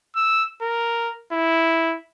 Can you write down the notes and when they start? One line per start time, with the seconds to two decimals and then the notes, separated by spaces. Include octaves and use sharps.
0.16 E6
0.62 A#4
1.32 E4